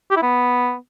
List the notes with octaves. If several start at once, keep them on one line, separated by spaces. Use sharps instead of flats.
G4
E4
B3